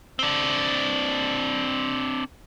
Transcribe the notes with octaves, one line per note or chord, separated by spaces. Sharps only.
C4 D4